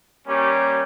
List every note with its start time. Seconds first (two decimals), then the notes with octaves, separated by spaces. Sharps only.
0.26 G3 A#3 C#4 G4